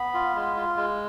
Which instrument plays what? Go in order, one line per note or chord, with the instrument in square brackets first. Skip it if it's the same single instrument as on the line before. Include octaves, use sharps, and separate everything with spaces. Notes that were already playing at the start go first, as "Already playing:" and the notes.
Already playing: [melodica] B3 B5
F4
G#3
F4
G#3